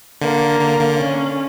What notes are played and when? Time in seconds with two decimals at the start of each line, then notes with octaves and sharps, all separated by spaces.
0.21 D3 A#3
0.60 D3
0.80 D3
0.99 C#4